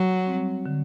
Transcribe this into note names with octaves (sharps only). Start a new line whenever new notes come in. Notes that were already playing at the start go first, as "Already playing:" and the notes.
Already playing: F#3
G3 C4
D3